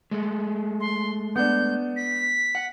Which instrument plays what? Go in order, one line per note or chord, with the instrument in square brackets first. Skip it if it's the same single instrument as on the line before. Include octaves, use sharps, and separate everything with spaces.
[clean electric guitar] G#3 A3
[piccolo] C6
[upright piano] B3 D4 [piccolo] G6
[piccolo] B6
[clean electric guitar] F#5